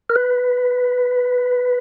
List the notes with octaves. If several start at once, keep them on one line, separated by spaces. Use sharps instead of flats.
A#4
B4